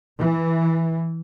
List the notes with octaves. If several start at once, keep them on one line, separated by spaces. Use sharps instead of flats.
E3